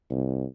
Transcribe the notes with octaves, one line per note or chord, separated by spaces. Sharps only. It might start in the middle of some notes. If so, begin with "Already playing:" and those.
C2